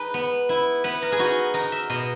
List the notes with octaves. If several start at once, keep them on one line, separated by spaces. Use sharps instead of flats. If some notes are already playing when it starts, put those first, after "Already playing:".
Already playing: D#4 G#4 B4
B3
E4
B3 B4
A#4
G#4
D#4 F#4
D#4 A#4
E5
B2 D#5